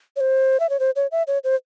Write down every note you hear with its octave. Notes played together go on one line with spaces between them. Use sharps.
C#5
C5
E5
C#5
C5
C#5
E5
C#5
C5